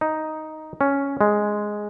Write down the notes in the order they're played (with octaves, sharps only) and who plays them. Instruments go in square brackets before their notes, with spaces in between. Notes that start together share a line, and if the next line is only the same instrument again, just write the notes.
[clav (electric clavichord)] D#4
C#4
G#3